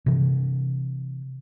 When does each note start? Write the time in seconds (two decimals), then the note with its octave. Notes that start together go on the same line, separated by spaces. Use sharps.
0.06 C3 E3